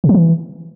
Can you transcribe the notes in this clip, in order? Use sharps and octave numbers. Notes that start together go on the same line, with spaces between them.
C3
F3
E3